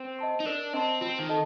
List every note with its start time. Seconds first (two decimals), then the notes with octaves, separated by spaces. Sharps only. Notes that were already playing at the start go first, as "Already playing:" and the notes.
Already playing: C4
0.19 D#5 A5 C6
0.40 D#4
0.46 D4 A#4
0.73 C4 D#5 A5 C6
1.01 C4 F4
1.19 D#3
1.29 A4 D#5 A5